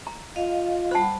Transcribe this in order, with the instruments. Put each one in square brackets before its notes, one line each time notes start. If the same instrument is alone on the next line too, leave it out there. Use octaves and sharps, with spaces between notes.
[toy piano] A#5
[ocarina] F4 [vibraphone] D#5 F5
[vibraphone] G3 F#5 B5 [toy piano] C5 A5